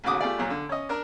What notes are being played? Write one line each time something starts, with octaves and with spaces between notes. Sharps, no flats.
A1 D#2 C#3 F#4 D6 D#6
A3 F4 G4 G#4 D5
A#1 A#2 F#3
D3
C#4 D#5
D4 A#4